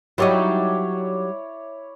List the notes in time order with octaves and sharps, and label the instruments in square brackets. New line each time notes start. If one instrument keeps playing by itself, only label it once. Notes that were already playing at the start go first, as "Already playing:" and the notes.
[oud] F#3 G3 D#4 [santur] E4 C#5 D5